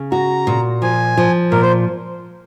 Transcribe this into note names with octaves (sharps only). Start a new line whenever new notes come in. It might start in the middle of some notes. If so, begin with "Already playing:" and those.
Already playing: C#3
F#4 A#5
A#2
F3 G#5
F3
A#2 A#4
C5